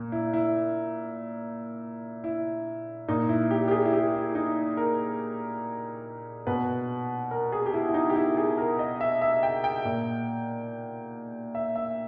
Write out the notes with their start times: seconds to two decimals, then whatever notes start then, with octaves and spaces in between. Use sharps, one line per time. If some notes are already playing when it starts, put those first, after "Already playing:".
Already playing: A#2
0.12 E4
0.33 E4
2.24 E4
3.08 A#2 D#4
3.29 E4
3.51 G4
3.68 G4
3.71 G#4
3.85 E4
3.93 G4
4.14 E4
4.35 D#4
4.77 A#4
6.47 B2 B4
7.31 A#4
7.52 G#4
7.66 G4
7.73 E4
7.88 E4
7.94 D#4
8.09 G4
8.16 E4
8.37 G#4
8.58 A#4
8.79 D#5
9.01 E5
9.22 E5
9.43 G5
9.64 G5
9.85 A#2
11.55 E5
11.76 E5